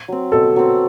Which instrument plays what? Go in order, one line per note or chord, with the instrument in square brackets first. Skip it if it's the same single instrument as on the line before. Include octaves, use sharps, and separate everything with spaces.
[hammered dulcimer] F#3 C4
[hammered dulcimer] B2 [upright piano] A4
[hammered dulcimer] F#3 C4